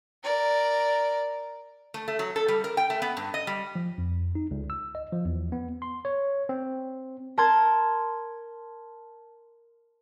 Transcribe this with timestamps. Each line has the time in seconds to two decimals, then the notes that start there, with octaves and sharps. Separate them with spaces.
0.23 A#4 D5
1.94 A3
2.08 A3
2.19 F#3
2.36 A4
2.48 G3
2.64 A#4
2.77 G5
2.90 A3
3.02 B3
3.17 G2
3.34 D#5
3.47 G3
3.76 F3
3.98 F2
4.35 D#4
4.51 C#2
4.70 E6
4.95 D#5
5.13 F3
5.25 E2
5.52 B3
5.82 C6
6.05 C#5
6.49 C4
7.38 A#4 A5 C6 G#6